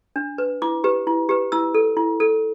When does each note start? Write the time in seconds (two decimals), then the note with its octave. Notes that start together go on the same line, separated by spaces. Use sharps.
0.16 D4
0.38 B4
0.62 E4 D6
0.84 G4 B4
1.07 E4
1.29 G4 B4
1.52 E4 E6
1.75 A4
1.97 E4
2.20 A4